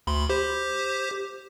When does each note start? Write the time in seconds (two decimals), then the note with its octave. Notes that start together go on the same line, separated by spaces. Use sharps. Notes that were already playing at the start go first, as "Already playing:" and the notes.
0.07 D2 B5 C6
0.29 G4 C5